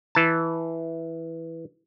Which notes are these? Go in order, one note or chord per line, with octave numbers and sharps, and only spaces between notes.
E3 A5